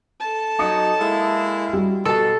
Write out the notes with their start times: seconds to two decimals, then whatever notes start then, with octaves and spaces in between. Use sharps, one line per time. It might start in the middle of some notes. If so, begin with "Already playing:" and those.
0.20 A4 A5
0.59 F#3 D#4 D6 D#6 C#7
0.99 G#3 A#3 E4
1.73 G3 F#4
2.05 B2 A4 A5